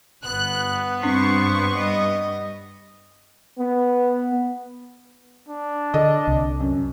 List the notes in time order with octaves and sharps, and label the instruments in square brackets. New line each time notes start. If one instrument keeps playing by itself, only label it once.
[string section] G1 F#6 [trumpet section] B3
[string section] G2 C#6 [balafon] C4 D4 [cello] C5
[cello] G3 D#5
[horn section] B3
[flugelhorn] D4
[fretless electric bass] D3 [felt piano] A4 D#5
[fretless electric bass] C2
[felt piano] F#2